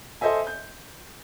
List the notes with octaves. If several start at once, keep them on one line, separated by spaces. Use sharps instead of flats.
A4 C5 D#5 E5 G#5
G6